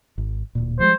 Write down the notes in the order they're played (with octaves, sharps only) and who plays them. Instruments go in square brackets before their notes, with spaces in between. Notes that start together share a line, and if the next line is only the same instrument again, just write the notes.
[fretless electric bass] G#1
D1 A#2
[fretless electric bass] F3 G3 G#3 [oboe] C5